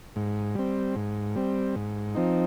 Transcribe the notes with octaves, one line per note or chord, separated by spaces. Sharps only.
G#2
G3 C4
G#2
G3 C4
G#2
F3 C4 D#4